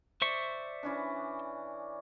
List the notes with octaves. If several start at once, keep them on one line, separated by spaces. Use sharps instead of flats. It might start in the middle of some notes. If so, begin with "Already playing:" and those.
C5 D5 E5 C#6
E3 C#4 D4